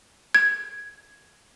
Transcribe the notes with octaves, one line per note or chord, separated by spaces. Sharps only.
G#6